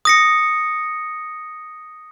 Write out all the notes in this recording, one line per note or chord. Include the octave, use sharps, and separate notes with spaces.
D#6 A#6 C#7